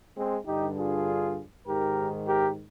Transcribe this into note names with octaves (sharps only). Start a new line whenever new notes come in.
G#3 C4
G2 D3 D#4 G4
F4 G#4
G#2 D#3 G4 A#4
G4 A#4